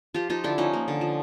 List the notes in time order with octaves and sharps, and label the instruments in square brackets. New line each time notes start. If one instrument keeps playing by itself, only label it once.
[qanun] F3 F4 G4
F3 D#4 F4
D3 D4 E4
F3 C#4 D#4
A#3
D3
F3